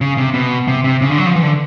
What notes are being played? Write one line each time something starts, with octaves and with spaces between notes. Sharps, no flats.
C#3
C3
B2
C3
C3
C#3
D3
F#3
F3
E3
D3